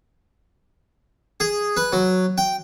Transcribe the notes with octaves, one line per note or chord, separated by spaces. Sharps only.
G#4
B4
F#3
G5